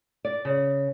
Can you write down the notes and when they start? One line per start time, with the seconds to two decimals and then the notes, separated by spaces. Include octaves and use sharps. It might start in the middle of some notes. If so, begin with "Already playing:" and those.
0.25 D5
0.45 C#3